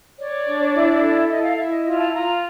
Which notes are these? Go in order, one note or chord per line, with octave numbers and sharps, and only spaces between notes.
C#5 D5
D4
E4
A4
E4 D#5
F5
E4 E5
D#5
F4 D#5
A5
F4 A#5